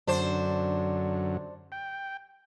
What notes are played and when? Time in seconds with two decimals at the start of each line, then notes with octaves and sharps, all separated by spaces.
0.07 F#2 D3 F#3 D4 C5
1.72 G5